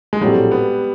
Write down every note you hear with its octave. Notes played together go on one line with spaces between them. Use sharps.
G#3
A#1 A2 F#3 G3 A3 C4
B3